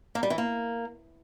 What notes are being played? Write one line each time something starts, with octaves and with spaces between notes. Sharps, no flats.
A#3
G3
E3
A#3